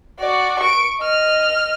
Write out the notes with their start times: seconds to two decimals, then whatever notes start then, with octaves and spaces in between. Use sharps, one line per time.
0.20 F#4 D5
0.60 C#6 D7
0.99 D#5 F6